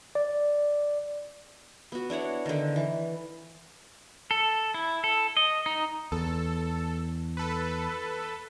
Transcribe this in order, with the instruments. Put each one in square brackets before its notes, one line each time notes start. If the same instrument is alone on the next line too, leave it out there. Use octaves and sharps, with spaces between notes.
[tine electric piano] D5
[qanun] B3 F#4
D4 E4 C#5 F#5
D3 D#3
E3
[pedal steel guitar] A4
E4
A4
D#5
D#4
[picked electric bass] E2 [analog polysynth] A4
[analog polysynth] A4 B4